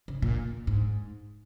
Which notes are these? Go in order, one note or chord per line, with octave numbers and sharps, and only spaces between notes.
C#3
A#2
G#2